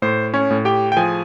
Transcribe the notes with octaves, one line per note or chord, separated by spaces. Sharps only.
A2 C5
C#4 C#5
A2
G4 G5
G5
F3 G#4 G#5